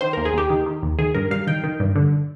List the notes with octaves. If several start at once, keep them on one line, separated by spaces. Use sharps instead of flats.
D#3 C5
D#2 A#4
G#4
D#2 G4
D#3
D#3
D#2
D#3 G#4
G2 A#4
G2 F5
D#3 G5
D#3
G2
D3